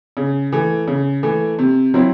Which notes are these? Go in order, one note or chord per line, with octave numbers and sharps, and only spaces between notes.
C#3
E3 A3
C#3
E3 A3
C3
F#3 C4 E4